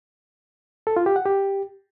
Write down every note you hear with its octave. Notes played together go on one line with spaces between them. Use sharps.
A4
F4
G4
F#5
G4